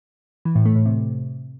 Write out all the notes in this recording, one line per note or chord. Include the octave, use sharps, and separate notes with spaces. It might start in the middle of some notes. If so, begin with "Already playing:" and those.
E3
A2
A3
A2
C3